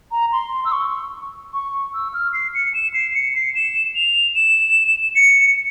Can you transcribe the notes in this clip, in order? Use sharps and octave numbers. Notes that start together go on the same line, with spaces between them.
A#5
C6
E6
C#6
C#6
E6
F6
C7
C#7
E7
C7
C#7
C7
E7
F7
E7
C#7